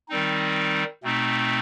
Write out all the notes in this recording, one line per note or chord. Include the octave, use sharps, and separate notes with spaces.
D#3 G3 C4 D#4
B2 A3 C4 D#4